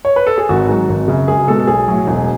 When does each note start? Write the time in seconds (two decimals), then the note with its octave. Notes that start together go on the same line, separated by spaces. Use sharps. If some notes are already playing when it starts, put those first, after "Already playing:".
0.05 C#5
0.16 B4
0.27 A4
0.38 G#4
0.49 G#1 F#4
0.69 G#2 F#3
0.89 G#1
1.08 F#2 C#3
1.28 C#2 G#4
1.47 B2 G#3 A4
1.59 A4
1.67 B1 G#4
1.88 A2 F#3
2.07 E1